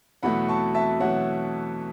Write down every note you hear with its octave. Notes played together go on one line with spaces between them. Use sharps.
E2 B2 F#3 A3 F#5 B5
A5 C#6
E5 A5
E2 B2 F#3 A3 C#5 F#5